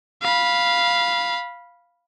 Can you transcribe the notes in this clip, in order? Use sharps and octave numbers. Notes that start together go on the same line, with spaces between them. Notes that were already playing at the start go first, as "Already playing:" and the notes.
F5 B5